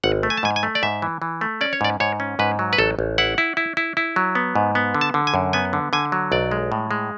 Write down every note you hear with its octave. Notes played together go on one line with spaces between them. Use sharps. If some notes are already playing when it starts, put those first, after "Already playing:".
G#1 F#5
A3
G#5
A5
G#2 G#5
G#5
A3
D5
G#2 E5
E3
E3
A3
C#4 D5
C#5
G#2 D5
G#2 C#5
C#4
G#2 B4
F#3
B4
A1 A4
A1
E4 F#5
E4
E4
E4
E4
F#3
B3
G#2
B3
D3
A5
D3
G#5
F#2
B3 G#5
D3
D3 G#5
F#3
B1 D5
G#3
A2
G#3